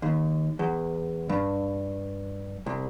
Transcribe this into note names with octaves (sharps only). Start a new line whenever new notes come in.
D#2
E2
G2
C2